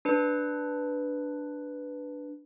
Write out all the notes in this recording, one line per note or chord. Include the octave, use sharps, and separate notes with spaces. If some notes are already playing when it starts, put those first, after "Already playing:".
D4 B4